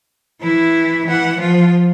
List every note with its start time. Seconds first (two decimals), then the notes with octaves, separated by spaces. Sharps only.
0.41 E3 E4
1.06 E3 F#5
1.40 F3 F4